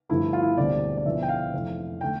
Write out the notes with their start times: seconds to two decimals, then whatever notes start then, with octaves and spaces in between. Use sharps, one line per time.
0.09 G2 D3 F3 A3 E4
0.33 F4
0.42 E4
0.57 E1 D2 D3 G3 C4 D5
0.97 D5
1.06 E1 E2 D3 F3 E5
1.22 G5
1.29 F5
1.53 F1 F2 E3
2.01 D3 A3 G5